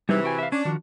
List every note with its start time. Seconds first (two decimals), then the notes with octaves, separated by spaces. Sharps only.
0.09 C3 E3 G3 D#4 G#4
0.24 F#4 G5 G#5
0.39 E5 F5
0.52 C#4 D4
0.65 D#3 F3 F#4